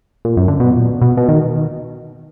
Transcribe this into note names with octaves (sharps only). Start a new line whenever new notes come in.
A#2
F#2
D3
B2
A#2
B2
B2
D#3